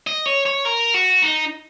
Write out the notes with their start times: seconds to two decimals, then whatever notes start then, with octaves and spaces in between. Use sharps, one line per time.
0.07 D#5
0.26 C#5
0.45 C#5
0.65 A#4
0.94 F#4
1.22 D#4